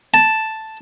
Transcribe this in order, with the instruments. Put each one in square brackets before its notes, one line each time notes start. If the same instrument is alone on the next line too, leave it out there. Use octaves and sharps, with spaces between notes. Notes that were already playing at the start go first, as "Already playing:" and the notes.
[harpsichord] A5